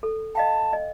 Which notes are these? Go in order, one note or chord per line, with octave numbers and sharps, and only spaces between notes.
A4
D#5 F5 G5 A5
D#5